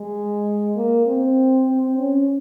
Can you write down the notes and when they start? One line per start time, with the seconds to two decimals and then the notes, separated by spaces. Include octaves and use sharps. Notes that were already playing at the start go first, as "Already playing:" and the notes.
Already playing: G#3
0.76 A#3
1.06 C4
1.67 C4
1.98 C#4